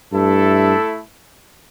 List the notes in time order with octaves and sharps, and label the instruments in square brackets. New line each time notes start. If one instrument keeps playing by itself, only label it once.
[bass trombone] G2 [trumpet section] A3 E4 A4